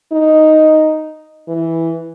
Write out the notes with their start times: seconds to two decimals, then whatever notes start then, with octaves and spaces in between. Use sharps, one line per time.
0.12 D#4
1.48 E3